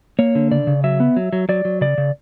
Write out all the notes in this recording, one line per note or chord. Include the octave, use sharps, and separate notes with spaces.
A#3 C#5
D3
C#3 D5
C#3
F#3 E5
B3
F#3
F#3
F#3 D5
F#3
C#3 D5
C#3